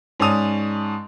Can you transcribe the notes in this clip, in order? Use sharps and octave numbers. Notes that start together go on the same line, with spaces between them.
G#2 C#4 D5 A5 D#6 F7